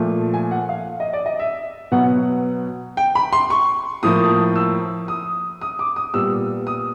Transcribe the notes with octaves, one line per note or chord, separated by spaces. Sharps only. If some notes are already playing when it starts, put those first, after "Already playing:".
Already playing: A#2 F3 A3
G#5
F#5
F5
D#5
D5
D#5
E5
B2 F#3 B3 F#5
G5
B5
C6
C#6
A2 F3 A#3 D#6
E6
D#6
D#6
D6
D#6
A#2 G3 B3 E6
D#6